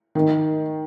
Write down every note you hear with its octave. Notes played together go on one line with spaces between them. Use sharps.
D#3